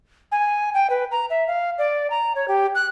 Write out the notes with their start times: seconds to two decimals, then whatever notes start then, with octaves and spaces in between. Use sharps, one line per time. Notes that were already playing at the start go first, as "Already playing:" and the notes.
0.32 G#5
0.74 G5
0.90 B4
1.12 A#5
1.30 E5
1.48 F5
1.78 D5
2.10 A#5
2.35 C#5
2.48 G4
2.75 F#6